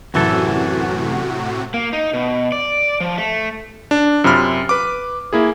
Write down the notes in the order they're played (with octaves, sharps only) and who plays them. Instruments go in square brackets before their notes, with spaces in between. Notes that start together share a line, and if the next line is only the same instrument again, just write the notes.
[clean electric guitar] F#2 E3 A4 [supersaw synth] A2 C3 F#4
[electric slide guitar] A#3
D#4
B2
D5
F3
A3
[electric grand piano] D4
F#2 C3 F4 B5 F6
B4 D6
A#3 E4 G#4